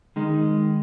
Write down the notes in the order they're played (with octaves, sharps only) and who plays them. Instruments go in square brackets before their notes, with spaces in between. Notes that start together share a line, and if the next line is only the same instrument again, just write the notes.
[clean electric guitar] D#3 G#3 D#4